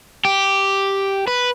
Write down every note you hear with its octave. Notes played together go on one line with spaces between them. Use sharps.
G4
B4